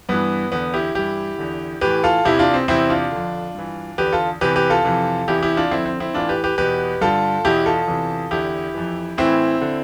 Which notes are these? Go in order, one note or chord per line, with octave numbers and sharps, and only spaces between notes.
G2 E3 B3
E2 D3 B3
E4 G4
G2 E3 E4 G4
E2 D3
A2 E3 G4 B4
F4 A4
E2 C3 E3 E4 G4
D4 F4
C4
E2 C3 E3 C4 E4
D4 F4
F2 D3
G2 E3
E2 D3 G4 B4
F4 A4
E2 C3 E3 G4 B4
G4 B4
F4 A4
F2 C3 E3
E2 C3 E3 E4 G4
E4 G4
D4 F4
F2 D3 C4 E4
C4
C4 E4
A2 E3 D4 F4
G4 B4
G4 B4
E2 B2 G4 B4
G2 D3 F4 A4
E2 B2 E4 G4
F4 A4
E2 C3 E3
E2 D3 E4 G4
F2 E3
A2 E3 C4 E4
D3